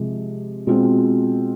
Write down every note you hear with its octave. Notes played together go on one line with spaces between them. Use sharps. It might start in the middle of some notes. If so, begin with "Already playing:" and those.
Already playing: C3 F3 G#3
B2 G#3 C4 F4